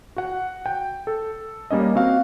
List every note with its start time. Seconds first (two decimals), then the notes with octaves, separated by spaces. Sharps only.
0.16 F#4 F#5
0.66 G5
1.07 A4
1.71 G3 A#3 C#4 D#5
1.95 C4 F#4 F5